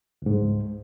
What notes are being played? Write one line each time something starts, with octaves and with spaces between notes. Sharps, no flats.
C#2 G#2